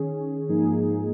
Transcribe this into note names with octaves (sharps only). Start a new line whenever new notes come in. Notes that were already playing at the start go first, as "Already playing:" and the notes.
Already playing: D#3 C#4 G#4
G#2 F3 A#3 D#4 G#4